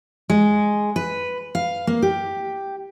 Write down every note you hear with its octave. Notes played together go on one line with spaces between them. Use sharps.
G#3
B4
F5
A#3
G4